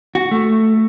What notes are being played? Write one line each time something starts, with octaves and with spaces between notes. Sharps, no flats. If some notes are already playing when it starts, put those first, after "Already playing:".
F#4
A3